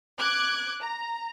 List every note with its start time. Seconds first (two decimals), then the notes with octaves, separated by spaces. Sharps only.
0.19 D6 F#6 G#6
0.80 A#5